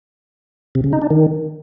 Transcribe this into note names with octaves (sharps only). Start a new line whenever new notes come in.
C3
C#3
D#4
D4
D#3